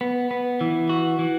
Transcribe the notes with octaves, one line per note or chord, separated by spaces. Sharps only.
B3
B3
E3
F#4
E3